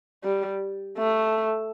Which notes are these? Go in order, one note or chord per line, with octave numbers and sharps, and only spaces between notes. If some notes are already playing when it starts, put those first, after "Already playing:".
G3
A3